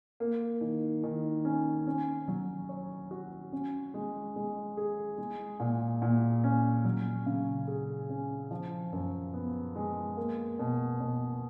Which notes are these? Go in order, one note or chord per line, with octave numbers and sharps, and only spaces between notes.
A#3
D#3
D#3
C#4
C#4
F#3
C#5
F#4
C#4
G#3
G#3
G#4
G#3
A#2
A#2
C#4
F#3
C#3
G#4
C#4
F3
F#2
B3
G#3
A#3
B2
B2